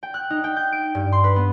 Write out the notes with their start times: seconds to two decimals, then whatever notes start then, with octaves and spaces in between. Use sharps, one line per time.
0.03 G5
0.14 F#6
0.30 D#4
0.44 G5
0.56 G6
0.72 D7
0.95 G2
1.12 C6
1.24 B4
1.36 B3